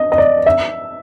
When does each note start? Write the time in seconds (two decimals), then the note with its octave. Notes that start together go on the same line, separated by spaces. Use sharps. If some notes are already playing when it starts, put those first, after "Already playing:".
Already playing: D#5
0.12 D#5
0.18 D5
0.46 E5